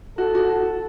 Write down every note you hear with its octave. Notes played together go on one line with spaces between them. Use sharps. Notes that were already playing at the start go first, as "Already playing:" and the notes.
F#4 A4
F#4